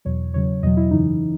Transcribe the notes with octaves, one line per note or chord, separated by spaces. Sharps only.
E2 B2 F#3 C#5
E2 C#3 F#3 C#5
E2 B2 F#3 D#5
E4
F#2 C#3 E3 D#4